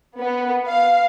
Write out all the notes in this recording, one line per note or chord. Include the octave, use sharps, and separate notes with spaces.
B3
F5